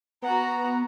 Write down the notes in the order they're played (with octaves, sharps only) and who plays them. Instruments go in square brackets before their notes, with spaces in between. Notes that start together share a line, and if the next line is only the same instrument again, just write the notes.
[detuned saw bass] B3 [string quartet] F#4 F#5 [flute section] A#5